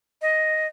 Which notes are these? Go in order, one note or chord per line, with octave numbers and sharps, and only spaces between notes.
D#5